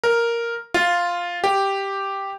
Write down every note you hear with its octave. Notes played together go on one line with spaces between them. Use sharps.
A#4
F4
G4